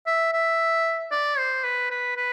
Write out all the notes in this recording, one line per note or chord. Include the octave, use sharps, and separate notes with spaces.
E5
E5
D5
C5
B4
B4
B4